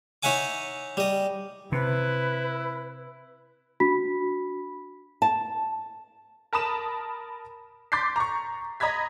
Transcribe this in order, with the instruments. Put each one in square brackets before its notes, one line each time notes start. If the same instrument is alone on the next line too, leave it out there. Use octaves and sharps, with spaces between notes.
[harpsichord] D#4 C#5 E5 F#5 G#5 D6
G3 D#5
[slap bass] C3 [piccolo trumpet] E4 [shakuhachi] B4
[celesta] D4 F#4 B5 B6
[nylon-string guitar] A5
[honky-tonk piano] A#4 A5 B5 D#6 E7
C6 D6 G6 A6 B6 C7
A#5 C#6
D#5 A#5 B5 G#6 B6